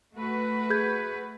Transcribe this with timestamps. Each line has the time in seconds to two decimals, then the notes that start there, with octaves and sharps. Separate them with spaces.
0.14 A3 F#4 B4
0.70 G#4 G6 G#6